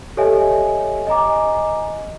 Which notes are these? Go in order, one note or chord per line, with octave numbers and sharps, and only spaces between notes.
G4 A4 C#5 D#5 E5 G#5
D#5 G#5 A#5 D6